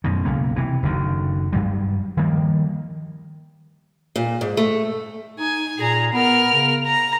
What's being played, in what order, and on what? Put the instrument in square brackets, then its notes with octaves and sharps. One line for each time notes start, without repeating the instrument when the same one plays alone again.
[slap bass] F#2 B2 D#3
B1 C#3 A#3
C3 E3
F#1 D2 D3 D#3
G2 F#3 G3
D#3 F3 G3 A#3
[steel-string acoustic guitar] A#2
G#2
A3
[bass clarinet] D#4 [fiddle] G#5
[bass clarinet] A#2 [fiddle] G#4 A#5
[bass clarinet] B3 [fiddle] A#4 F6
[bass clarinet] C#3
[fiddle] A#5